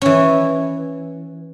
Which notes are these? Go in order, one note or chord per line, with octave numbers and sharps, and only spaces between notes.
E3 C#4